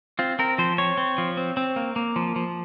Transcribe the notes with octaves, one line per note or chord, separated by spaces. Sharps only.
C4 F4
C4 A#4
F3 C5
C4 C#5
C4
F3
C4
C4
A#3
A#3
F3
F3